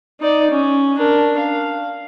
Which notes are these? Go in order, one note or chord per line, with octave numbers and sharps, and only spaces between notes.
D#4 D5
C#4
D4 A#4
F5